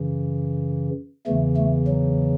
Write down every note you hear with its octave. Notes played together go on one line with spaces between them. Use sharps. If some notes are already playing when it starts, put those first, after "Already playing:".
Already playing: F#2 C#3 E3
E2 C#3 E3 A3
A3
F#3